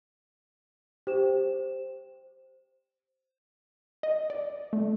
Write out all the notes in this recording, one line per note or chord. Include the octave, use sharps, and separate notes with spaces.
G4 C5 E7
D#5
D5
A3